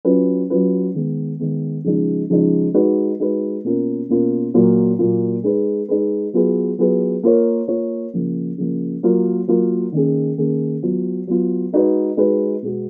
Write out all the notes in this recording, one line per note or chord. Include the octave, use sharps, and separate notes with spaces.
F#3 C#4 F4 B4
F#3 C#4 F4 B4
D#3 G#3 B3
D#3 G#3 B3
C#3 F3 G#3 D#4
C#3 F3 G#3 D#4
G#3 D#4 F#4 B4
G#3 D#4 F#4 B4
B2 A#3 C#4 F4 A#4
B2 A#3 C#4 F4 A#4
A#2 F#3 A#3 F4
A#2 F#3 A#3 F4
G#3 D#4 G#4 B4
G#3 D#4 G#4 B4
F#3 B3 F4 G#4 B4
F#3 B3 F4 G#4 B4
A#3 F4 A#4 C#5
A#3 F4 A#4 C#5
C#3 F3 A#3
C#3 F3 A#3
F#3 A#3 F4 A#4
F#3 A#3 F4 A#4
D#3 A#3 C#4 G#4
D#3 A#3 C#4 G#4
F#3 B3 F4
F#3 B3 F4
G#3 D#4 F#4 B4
G#3 D#4 F#4 B4
B2 G#3 B3 F#4